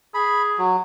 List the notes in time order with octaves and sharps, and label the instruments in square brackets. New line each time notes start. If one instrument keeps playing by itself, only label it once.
[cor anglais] G#4 [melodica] B5
[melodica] F#3